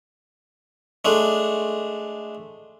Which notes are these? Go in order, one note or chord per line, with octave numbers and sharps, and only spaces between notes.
G#3 A3 D4